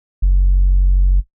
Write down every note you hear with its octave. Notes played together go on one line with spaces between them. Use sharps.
F#1